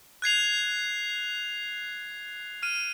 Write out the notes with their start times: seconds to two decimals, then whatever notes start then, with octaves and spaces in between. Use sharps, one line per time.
0.22 F#6 G#6 C7 F7
2.63 F6 D#7